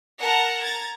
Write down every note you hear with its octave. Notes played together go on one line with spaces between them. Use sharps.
A#4 F#5 A5 A#5
A#5 G#6 A6